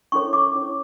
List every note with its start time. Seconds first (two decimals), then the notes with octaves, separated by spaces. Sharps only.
0.12 C#4 E4 A4 C#5 C#6
0.33 D6
0.54 C#4 E4 A4 C#5